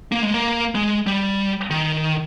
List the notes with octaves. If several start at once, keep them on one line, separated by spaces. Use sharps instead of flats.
A#3
G#3
A#3
G#3
G3
D#3